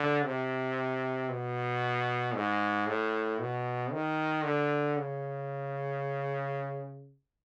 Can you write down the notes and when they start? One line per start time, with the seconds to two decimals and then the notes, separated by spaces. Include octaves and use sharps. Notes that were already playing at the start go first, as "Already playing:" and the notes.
Already playing: D3
0.25 C3
1.29 B2
2.35 G#2
2.87 A2
3.39 B2
3.92 D#3
4.44 D3
4.97 C#3